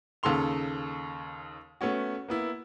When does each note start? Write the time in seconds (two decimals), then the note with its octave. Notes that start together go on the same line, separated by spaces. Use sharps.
0.23 D#2 C#3 A4 F5 C6 F7
1.81 A3 B3 C#4 F#4
2.29 A#3 B3 E4